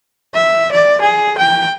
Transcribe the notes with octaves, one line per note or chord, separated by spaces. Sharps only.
E5
D5
G#4
G5